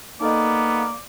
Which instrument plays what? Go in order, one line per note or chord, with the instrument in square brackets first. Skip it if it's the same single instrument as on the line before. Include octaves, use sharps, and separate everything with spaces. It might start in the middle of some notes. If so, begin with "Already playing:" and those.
[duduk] A#3 [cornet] B3 [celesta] D#4 A4 D#5 [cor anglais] D5